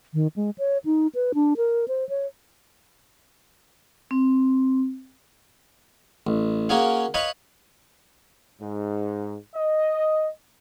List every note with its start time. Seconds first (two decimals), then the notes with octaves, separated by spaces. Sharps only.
0.14 D#3
0.36 G#3
0.58 C#5
0.85 D#4
1.15 B4
1.34 D4
1.57 A#4
1.88 C5
2.09 C#5
4.11 C4
6.27 A1
6.69 A#3 C#4 F#4 G#4 F5
7.14 B4 C#5 D#5 F5 B5
8.61 G#2
9.55 D#5